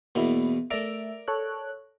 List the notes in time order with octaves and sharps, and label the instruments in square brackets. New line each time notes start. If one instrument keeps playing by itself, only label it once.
[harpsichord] E2 B2 [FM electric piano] A#3 E4
[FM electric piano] A3 E5 [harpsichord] A#4 D5 A#5
[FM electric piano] A4 C#5 F#6